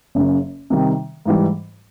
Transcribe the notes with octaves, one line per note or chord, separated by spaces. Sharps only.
F#1 F#2 C#3
C3 D#3 G3
G#2 E3 G3